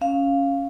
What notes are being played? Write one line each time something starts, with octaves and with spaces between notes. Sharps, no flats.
C#4 F5